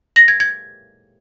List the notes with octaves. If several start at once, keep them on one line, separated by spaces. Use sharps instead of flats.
A#6
G#6
G#6